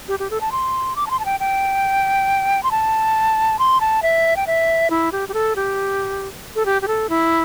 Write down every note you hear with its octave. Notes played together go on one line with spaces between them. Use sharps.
G4
G4
A4
A5
C6
D6
A5
C6
A5
G5
G5
C6
A5
C6
A5
E5
G5
E5
E4
G4
G4
A4
G4
A4
G4
G4
A4
E4